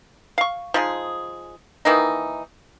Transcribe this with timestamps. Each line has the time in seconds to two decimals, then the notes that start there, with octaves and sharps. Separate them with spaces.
0.38 F5 C#6
0.74 F3 G#3 D#4 G#4
1.85 D#3 E3 A#3 D#4